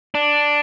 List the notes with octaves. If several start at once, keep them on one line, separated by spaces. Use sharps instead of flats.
D4